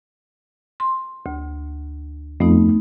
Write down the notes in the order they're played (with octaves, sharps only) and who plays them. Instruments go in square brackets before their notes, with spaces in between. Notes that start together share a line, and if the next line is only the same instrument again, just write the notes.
[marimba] C6
D2
[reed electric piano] F2 [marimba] A3 B3 D#4